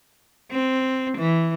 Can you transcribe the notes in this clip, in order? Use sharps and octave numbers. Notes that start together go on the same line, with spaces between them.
C4
E3